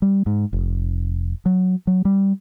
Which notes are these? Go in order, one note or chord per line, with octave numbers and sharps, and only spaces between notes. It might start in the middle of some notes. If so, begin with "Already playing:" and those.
G3
G#2
F1
F#3
F#3
G3